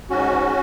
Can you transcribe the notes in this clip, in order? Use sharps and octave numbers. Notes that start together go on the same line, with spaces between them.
G#2 C#4 F#4